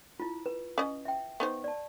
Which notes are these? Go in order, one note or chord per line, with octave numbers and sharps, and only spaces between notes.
E4 F4
B4
C#4 D#5
E5 G5
B3 D#4 C5 C#6
D5 A5